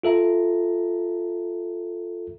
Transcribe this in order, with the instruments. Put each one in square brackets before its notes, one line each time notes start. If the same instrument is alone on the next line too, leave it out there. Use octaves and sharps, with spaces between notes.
[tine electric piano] F4 A4 E5 A#5